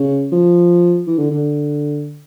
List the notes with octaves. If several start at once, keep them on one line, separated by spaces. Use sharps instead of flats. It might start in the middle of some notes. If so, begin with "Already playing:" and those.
Already playing: C#3
F3
E3
D3
D3